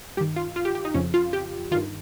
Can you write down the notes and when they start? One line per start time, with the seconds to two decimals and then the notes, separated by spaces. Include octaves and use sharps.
0.17 G2 G4
0.21 D#3
0.36 F4
0.56 F4
0.65 G4
0.75 G4
0.85 D#4
0.94 F2 C#3 F3 C#4
1.14 F4
1.33 G4
1.71 D#3 F4
1.75 G2